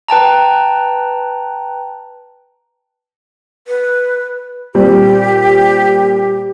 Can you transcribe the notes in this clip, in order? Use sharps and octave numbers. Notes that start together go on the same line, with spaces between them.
B4 G5 A5 A#5
B4
A#2 G3 C4 G4